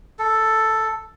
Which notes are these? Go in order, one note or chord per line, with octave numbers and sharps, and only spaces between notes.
A4